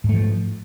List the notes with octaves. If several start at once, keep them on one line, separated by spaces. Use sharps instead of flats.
G#2 F3 A3